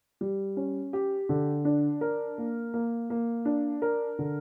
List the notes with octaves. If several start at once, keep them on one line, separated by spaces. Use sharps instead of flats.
G3
C#4
G4
D3
D4
A#4
A#3
A#3
A#3
D4
A#4
D3